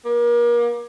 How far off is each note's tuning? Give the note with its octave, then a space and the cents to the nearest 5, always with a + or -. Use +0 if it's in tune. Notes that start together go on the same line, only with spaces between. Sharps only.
A#3 +35